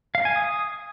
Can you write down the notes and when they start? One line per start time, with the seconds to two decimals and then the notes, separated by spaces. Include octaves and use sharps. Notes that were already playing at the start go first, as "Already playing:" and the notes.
0.15 F5
0.25 G#5
0.36 D#6